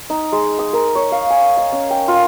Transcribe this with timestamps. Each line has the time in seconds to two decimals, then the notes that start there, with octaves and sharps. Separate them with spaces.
0.10 D#4
0.32 G#3
0.59 D#6
0.73 A#4
0.95 C#5
1.12 F5
1.30 G#5
1.57 D#5
1.72 C#4
1.91 G5
2.08 F4